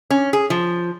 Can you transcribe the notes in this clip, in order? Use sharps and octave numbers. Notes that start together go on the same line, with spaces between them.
C#4
G#4
F3